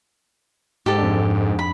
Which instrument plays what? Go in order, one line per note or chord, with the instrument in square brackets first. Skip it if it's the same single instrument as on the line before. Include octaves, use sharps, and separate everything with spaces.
[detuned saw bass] G#2 [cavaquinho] G4 A4
[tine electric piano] F2 D4
[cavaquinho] B5